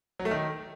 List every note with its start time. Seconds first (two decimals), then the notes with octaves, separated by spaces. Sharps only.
0.19 F#3
0.25 A3
0.31 D#3